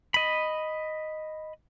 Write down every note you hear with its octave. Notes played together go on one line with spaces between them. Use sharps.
D#5 B5